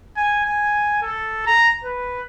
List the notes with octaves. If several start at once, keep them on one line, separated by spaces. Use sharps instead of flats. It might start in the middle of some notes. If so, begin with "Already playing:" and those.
G#5
G#5
A4
A#5
B4